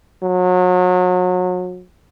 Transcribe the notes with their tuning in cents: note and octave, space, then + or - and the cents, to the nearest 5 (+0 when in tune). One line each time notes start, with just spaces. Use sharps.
F#3 -30